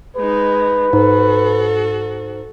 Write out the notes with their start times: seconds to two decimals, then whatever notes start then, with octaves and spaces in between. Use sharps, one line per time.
0.16 G#3 D#4 B4
0.93 G#2 F#4 A4